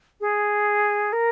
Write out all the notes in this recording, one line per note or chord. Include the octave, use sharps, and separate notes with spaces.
G#4
A#4